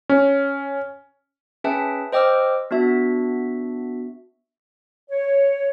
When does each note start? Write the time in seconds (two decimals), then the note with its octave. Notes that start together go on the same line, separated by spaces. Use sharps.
0.09 C#4
1.64 C#4 G#4 B4 E5 G5 A5
2.12 C5 D#5 G5 D6 E6 F6
2.71 B3 D4 F#4 E5
5.10 C#5